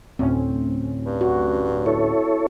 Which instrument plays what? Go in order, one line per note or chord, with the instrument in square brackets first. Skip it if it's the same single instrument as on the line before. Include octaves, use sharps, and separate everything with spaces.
[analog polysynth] D2 A2 C#4 [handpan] C4
[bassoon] G2
[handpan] F#4
[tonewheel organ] E4 A4 C#5